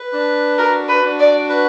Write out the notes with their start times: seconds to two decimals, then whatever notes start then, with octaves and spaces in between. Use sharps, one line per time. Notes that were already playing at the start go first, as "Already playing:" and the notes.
Already playing: B4
0.13 D4
0.58 F#4 A#4
0.89 B4
1.03 D4
1.19 D5
1.49 B4